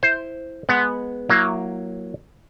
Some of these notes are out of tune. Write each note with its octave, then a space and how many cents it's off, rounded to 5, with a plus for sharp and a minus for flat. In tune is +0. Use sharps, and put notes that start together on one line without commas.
E4 +0 C5 +0
G#3 +0 B3 +0 F#5 +0
F#3 +0 A#3 +0 E4 +30